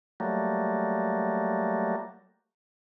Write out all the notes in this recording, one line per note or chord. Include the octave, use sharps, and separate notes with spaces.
F#3 G3 A3 A#3